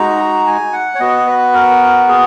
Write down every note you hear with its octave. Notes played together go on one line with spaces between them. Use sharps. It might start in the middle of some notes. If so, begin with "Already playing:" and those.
Already playing: G#3 D#4 F#4 A#5
G#5
F#5
C#5
B3 F#4 D#5
B4
A#4
G#4